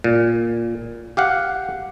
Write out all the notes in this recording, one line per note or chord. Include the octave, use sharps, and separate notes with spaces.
A#2
G4 F5 F#5